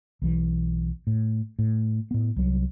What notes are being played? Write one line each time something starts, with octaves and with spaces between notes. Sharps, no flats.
B1 E3
A2
A2
A2 B3
C2 F#3